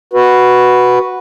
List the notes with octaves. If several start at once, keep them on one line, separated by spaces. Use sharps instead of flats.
F#4 B4